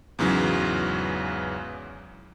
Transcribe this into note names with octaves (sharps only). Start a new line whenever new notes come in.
E2 G#2 C#3 E3 F#3